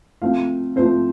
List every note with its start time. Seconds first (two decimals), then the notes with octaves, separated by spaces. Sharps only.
0.22 F3 A3 C4 F5
0.76 F3 A3 C4 C5